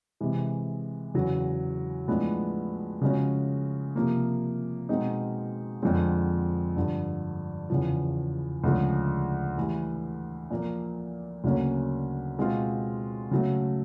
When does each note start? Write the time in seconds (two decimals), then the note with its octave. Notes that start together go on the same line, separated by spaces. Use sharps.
0.21 C3 E3 G#3
1.14 E2 C#3 F#3
2.08 A2 F3 G#3 B3 D4
3.01 C#3 F3 G#3 C#4 F#4
3.96 C3 F3 A#3
4.89 B2 G#3 C4 D#4
5.83 F2 D3 F3 G#3 C4
6.76 G2 D3 F3
7.70 E2 C#3 F3
8.64 D2 C#3 F3 G#3
9.57 A2 E3 G3
10.50 A#2 F3 A#3
11.44 D2 C#3 F#3 A#3 C#4
12.38 B2 G#3 C4 F4
13.31 C#3 F#3 A3